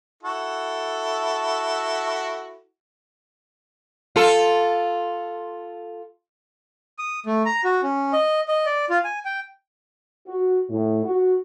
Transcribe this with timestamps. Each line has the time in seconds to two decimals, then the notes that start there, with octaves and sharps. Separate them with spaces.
0.23 E4 F#4 A4
4.16 F4 A4
6.99 D#6
7.26 A3
7.45 A#5
7.64 F#4
7.83 C#4
8.13 D#5
8.48 D#5
8.66 D5
8.90 F4
9.04 G#5
9.25 G5
10.28 F#4
10.70 A2
11.04 F#4